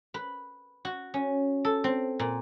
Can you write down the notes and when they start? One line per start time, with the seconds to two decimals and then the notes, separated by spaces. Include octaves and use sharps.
0.14 B4
0.85 F#4
1.14 C#4
1.65 A4
1.84 C4
2.19 A#2